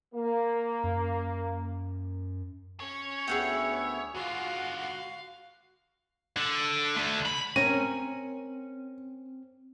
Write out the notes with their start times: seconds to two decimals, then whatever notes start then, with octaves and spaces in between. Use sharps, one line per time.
0.15 A#3
0.84 F#2
2.80 C#4 C#5
3.28 D2 B3 G#4 E5 F#5 G5
4.14 G#2 D3 F4 F#4 F5
4.81 F5
6.37 D3
6.96 D3 A3
7.26 B5
7.56 C4 C#4 A#4 D#7